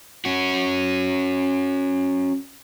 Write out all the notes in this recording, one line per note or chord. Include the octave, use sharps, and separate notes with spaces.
C#4 F#4